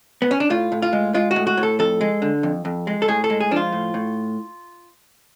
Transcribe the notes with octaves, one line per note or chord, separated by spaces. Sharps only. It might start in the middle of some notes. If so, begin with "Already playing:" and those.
B3
C#4
D4
A2 F4
A2
F4
G#3
G#3 F4
F#4
A2
F#4
A2
A4
F2 A4
G#3
D3
F2
F2
G#3
A4
A2 G#4
A4
G#3
G#4
F3 D4 F4
A2
A2